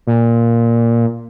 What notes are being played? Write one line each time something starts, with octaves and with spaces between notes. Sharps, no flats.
A#2